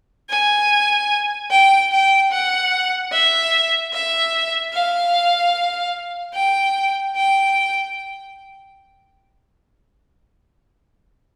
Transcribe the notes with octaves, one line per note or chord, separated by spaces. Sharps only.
G#5
G5
G5
F#5
E5
E5
F5
G5
G5